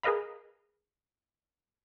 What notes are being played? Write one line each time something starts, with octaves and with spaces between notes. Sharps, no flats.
G#4 A#4 B4 D#5 F5 B5